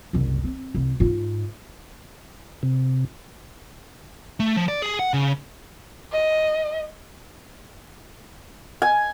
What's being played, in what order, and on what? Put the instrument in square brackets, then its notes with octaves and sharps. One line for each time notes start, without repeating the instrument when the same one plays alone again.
[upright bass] F#1 C2
C4
C2
G#2 F4
[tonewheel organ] C3
[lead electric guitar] A3
F3
D5
G#4
F#5
C#3
[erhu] D#5
[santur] G#5